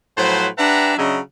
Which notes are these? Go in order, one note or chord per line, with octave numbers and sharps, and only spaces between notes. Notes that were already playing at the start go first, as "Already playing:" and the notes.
A2 F3 F#3 B4 C5
D4 G4 B4 E5 F#5 A#5
C#3 F#3 D4 D#5 E5